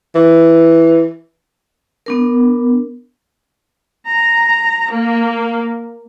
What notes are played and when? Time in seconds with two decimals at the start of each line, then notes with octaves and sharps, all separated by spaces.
0.15 E3
2.06 B3 D4 A#4
4.11 A#5
4.93 A#3